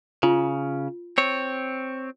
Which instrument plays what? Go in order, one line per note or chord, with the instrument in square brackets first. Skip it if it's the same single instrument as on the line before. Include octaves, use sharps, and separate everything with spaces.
[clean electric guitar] C#3 [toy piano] F4
[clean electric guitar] C4 C#5